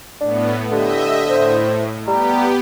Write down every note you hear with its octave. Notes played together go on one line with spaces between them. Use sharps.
A2 B3 D4
D3 G4 D#5 E5
A2 C5
G3 B3 G4 A#5